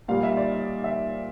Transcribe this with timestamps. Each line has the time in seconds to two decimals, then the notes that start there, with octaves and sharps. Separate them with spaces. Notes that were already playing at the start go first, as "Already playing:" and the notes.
0.08 A#2 G3 F5
0.23 E5
0.37 D5
0.52 D#5
0.84 E5